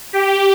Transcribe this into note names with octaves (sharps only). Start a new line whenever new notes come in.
G4